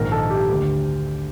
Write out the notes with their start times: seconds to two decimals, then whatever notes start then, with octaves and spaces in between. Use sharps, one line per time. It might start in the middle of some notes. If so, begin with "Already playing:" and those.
Already playing: A#1 G#2 D#3 A#4
0.12 A4
0.30 G4
0.49 D2 D3